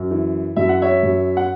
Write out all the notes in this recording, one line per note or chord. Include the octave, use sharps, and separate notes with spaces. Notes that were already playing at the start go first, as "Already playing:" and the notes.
Already playing: F#2
E3
F#2 E5
F#5
C#5 E5
F#2
F#5